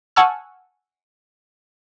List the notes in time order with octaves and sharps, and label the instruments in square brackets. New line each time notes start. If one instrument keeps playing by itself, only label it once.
[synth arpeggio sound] F#5 G#5 A5 C#6 E6 F6